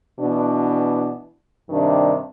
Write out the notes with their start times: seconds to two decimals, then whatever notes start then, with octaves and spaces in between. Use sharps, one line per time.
0.19 B2 E3 D4
1.70 G2 C3 D#3 D4